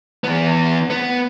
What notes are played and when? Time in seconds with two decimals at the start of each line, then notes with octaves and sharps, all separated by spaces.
0.24 E3 B3
0.90 B3